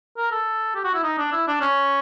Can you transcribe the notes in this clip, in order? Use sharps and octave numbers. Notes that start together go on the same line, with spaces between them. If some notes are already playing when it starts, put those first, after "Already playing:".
A#4
A4
G4
F#4
E4
D#4
D4
E4
D4
C#4